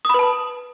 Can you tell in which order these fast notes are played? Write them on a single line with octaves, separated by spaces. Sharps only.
D#6 B5 B4 A5